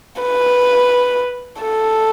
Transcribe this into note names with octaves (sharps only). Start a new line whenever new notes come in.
B4
A4